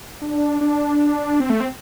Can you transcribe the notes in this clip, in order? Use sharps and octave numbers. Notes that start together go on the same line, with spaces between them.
D4
D4
C4
A3
C4